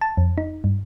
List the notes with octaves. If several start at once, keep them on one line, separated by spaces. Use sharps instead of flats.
A5
F2
D#4
G2